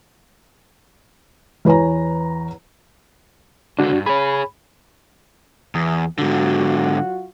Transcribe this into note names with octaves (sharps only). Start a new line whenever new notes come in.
E2 B4 C#5 G#5 A#5
C#2 D3 D4 F#4
G2
G#4 C#5 B5
E2
G#2 D3 F#3 F4 F#4